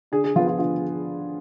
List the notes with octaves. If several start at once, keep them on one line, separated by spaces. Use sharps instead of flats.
D3 G#4
G#4
F3 B3 F4
F4
D3 F4